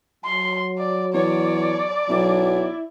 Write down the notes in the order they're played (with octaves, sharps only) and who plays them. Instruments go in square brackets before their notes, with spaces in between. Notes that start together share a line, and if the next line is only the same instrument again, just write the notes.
[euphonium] F#3 [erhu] C6
[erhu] D5
[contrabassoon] E2 [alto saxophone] C#5 [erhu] D5
[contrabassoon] B1 [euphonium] F#3 [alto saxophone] E4